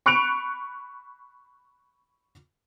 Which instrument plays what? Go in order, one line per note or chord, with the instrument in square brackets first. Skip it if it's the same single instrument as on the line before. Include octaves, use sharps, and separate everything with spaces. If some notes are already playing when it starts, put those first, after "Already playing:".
[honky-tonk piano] B5 C#6 F#6 C#7 D7 F7